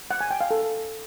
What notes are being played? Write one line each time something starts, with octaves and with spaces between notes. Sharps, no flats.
F#5
G#5
G5
F5
A4